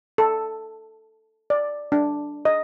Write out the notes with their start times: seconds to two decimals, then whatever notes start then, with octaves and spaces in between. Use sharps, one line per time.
0.18 A4
1.50 D5
1.92 D4
2.45 D#5